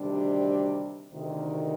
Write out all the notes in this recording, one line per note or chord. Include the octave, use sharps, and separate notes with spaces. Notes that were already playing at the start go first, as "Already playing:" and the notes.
Already playing: D2 C3 D#3 G3 D4
D2 C3 D#3